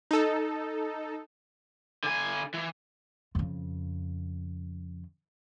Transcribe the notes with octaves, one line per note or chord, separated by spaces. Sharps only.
D#4 A4
D3 G#5
E3
F2 C#3